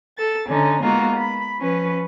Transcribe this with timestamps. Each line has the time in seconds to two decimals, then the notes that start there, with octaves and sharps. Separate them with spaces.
0.17 A4 A6
0.47 D3 C#4 D#4
0.82 G#3 A#3 B3 D#4 F4 F#4
1.16 B5
1.58 F3 C#4 B4